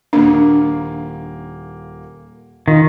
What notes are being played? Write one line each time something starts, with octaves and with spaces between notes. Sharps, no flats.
D#1 A#3 D4
D#3 F4